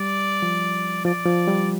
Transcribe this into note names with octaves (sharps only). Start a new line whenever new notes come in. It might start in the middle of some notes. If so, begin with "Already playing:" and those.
Already playing: G3 D5
F3
F3 D5
F3
G3